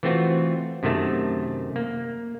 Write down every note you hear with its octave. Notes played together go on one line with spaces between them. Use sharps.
E3 A3 C4 F4 F#4
F#2 C3 D#3 A3 A5
A#3